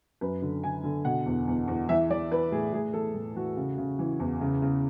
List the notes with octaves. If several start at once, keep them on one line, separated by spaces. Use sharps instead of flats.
F#2 B4
D3
D3 G#5
D3
B2 F#5
E2
E2
E2
E3 E5
E3 D5
E3 B4
A2 G#4
A2 G#4
E3 A4
A2
E3 F#4
C#3
C#3
E3
E2
C#3
C#3